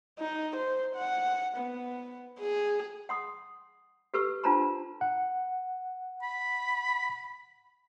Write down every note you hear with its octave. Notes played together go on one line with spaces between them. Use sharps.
D#4
C5
F#5
B3
G#4
F#5 C6 D#6
G4 A4 B4 C#6 E6
D4 F4 C5 A5 A#5 C6
F#5
B5